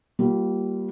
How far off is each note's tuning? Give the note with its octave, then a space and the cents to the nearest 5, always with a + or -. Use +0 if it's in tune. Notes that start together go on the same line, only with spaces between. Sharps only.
G3 -25 A#3 +0 F4 +0